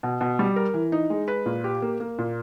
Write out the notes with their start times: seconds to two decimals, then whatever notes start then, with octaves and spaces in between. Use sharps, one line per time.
0.03 B2
0.21 B2
0.39 G3
0.56 A#4
0.74 E3
0.92 D#4
1.10 G#3
1.28 B4
1.46 A#2
1.64 G4
1.82 A#3
2.00 A#3
2.18 A#2